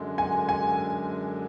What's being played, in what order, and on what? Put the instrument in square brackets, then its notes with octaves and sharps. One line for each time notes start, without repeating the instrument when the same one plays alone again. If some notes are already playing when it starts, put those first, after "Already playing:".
Already playing: [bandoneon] F#2 D3 G#3
[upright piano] G#5
G#5